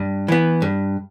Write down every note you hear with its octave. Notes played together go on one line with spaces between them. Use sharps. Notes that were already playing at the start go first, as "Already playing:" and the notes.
Already playing: G2
E3 B3
G2